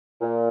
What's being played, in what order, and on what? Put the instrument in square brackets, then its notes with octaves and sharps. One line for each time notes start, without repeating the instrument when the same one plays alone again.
[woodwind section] A#2